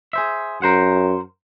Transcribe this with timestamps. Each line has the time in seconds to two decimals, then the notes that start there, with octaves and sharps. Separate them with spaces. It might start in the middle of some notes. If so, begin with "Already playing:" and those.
0.13 G#4 C5 E5
0.62 F#2 A#4 C5 F#5